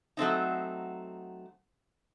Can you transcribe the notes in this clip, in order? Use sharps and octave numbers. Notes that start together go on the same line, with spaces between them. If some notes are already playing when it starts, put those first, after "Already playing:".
F#3 A3 C4 D#4